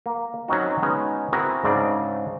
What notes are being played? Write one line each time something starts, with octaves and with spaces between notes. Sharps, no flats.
A#3
F#3 C4 C#4 D#4 F#4
G#3 B3 C#4 D#4
C4 E4 F#4 G#4 A#4
G#2 C#3 C4 D4 D5